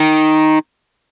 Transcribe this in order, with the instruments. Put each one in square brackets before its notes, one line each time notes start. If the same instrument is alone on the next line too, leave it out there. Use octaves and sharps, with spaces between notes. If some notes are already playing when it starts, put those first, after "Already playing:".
Already playing: [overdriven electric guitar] D#3